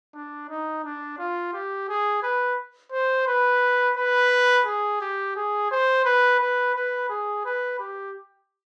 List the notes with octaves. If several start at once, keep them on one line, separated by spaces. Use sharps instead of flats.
D4
D#4
D4
F4
G4
G#4
B4
C5
B4
B4
G#4
G4
G#4
C5
B4
B4
B4
G#4
B4
G4